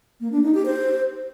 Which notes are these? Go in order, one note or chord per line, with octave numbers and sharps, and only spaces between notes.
A#3
D4
D#4
G4
C5